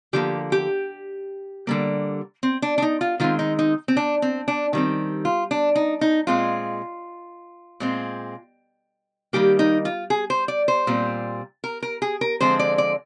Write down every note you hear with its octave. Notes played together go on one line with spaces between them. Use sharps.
D3 F3 A#3 G4
G4
D3 G3 A#3
C4
D4
D4
D#4
F4
D#3 G#3 C4 F4
D#4
D#4
C4
D4
C4
D4
D#3 G3 C4
F4
D4
D#4
D#4
A#2 G#3 C4 F4
A#2 G#3 C4
D#3 G3 A#3 G4
D#4
F4
G#4
C5
D5
C5
A#2 G3 C4
A#4
A#4
G#4
A#4
D3 F3 G#3 C4 C5
D5
D5